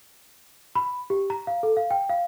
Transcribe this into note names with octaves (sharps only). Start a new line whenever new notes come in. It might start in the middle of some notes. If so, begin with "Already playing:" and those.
B5
G4
A#5
F5
A4
F5
G5
F5